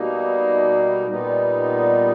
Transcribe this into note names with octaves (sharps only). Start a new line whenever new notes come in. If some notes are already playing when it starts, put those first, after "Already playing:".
Already playing: B2 G3 A#3 D#4
A#2 G3 B3 D#4